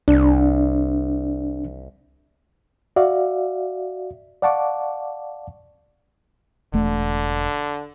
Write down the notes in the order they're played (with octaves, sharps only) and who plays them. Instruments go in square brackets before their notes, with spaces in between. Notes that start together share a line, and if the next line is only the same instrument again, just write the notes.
[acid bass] C2 [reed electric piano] D4
[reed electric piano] F#4 D5 E5 F5
D5 F5 F#5 A5 C#6 D6
[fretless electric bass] E1 A3 [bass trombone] D3